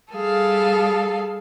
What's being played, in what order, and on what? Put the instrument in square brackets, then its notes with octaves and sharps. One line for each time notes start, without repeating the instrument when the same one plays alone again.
[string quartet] G3 G#4 A4 F5